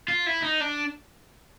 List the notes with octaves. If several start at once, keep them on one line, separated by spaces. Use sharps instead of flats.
F4
E4
D#4
D4